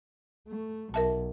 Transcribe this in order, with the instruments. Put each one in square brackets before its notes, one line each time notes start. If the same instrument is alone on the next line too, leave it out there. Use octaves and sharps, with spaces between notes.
[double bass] A3
[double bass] B1 [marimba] A#4 E5 A5